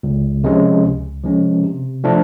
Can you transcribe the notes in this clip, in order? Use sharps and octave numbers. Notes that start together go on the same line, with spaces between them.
C#2
C3 F3 G#3 C#4
C#2
C3 F3 G#3 C#4
C3
F3 A3 D4